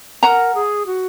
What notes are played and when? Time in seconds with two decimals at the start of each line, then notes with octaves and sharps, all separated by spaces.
0.23 A#4 F#5 A#5
0.55 G#4
0.86 F#4